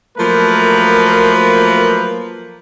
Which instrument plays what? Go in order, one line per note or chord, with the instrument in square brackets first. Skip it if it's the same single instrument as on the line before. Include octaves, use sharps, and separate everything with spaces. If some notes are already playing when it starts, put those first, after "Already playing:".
[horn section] F3 F#3 A3 A#3 A#4 B4